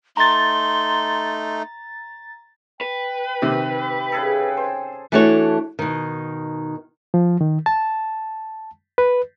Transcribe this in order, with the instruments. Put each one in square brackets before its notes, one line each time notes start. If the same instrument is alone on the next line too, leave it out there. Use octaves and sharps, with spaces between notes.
[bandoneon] A3 D#4 [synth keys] A#5 A6 [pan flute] C6
[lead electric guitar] B4 [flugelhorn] G5
[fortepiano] C3 D#3 [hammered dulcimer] G4
[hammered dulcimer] C#3 G#4 A4
C5
[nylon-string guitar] E3 A3 D4 F#4 A4 C#5
B2 D#3
[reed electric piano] F3
D#3
A5
B4